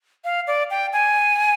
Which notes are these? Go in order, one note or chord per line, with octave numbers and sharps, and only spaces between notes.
F5
D5
G5
G#5